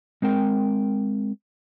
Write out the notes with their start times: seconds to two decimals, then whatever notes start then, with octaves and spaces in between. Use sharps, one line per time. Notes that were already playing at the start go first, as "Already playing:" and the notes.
0.22 G#3 C4 A#4 G5